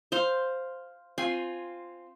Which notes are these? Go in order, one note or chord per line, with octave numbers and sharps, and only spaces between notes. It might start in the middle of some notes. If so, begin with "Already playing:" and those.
C5 F5 C6
C4 F4 G#5